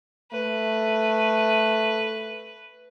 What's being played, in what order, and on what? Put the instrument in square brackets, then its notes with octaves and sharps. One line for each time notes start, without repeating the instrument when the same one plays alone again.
[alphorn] A3 [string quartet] B4